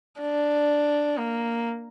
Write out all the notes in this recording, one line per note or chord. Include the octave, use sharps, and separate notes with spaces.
D4
A#3